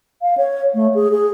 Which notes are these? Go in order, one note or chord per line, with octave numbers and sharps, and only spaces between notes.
F5
C#5
A3
G#4
G#4